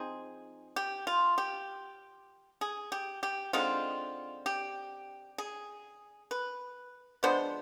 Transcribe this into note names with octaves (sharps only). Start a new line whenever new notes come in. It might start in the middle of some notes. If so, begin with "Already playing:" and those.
Already playing: F3 C4 D#4 G#4
G4
F4
G4
G#4
G4
G4
D3 G#3 C4 D#4 F4
G4
G#4
B4
F3 G#3 B3 D4 C5